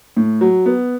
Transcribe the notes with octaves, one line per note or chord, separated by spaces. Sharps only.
A2
F#3
B3